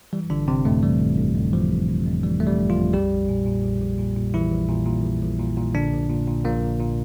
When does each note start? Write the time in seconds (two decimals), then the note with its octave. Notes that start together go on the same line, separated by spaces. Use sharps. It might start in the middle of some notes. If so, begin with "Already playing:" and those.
0.13 E3 G3
0.30 G1 D3 D4
0.47 G1 C3 C4
0.65 F2 A2 A3
0.83 E3 G3
1.00 G1
1.18 G1
1.36 F2
1.53 E3 F3
1.71 G1
1.88 G1
2.06 F2
2.23 E3 G3
2.40 G1 A3
2.47 G3
2.59 G1
2.70 F3 F4
2.76 F2
2.93 A#1 G3 G4
3.11 A#1
3.29 A#2
3.46 A#2
3.64 A#1
3.81 A#1
3.98 A#2
4.17 A#2
4.34 A#1 E3 E4
4.52 A#1
4.69 A#2
4.86 A#2
5.04 A#1
5.22 A#1
5.39 A#2
5.57 A#2
5.74 A#1 D3 D4
5.92 A#1
6.10 A#2
6.27 A#2
6.45 A#1 A#2 A#3
6.62 A#1
6.80 A#2